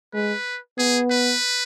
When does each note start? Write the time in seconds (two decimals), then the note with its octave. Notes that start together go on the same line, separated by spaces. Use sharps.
0.14 G#3 B4
0.78 B3 G#4
1.11 B4